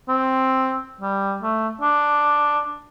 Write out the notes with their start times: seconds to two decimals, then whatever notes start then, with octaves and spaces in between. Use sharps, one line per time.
0.08 C4
1.01 G3
1.42 A3
1.81 D4